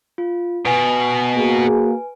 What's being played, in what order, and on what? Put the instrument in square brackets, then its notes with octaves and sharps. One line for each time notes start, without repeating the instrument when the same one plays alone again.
[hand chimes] F4
[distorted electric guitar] B2 [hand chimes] B4 G#5 D7
[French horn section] A#3 F#4 G#4